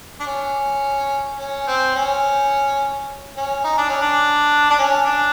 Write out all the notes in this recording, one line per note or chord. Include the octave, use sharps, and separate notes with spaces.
D4
C#4
C#4
C4
C#4
C#4
D#4
D4
C#4
D4
D4
C#4
D4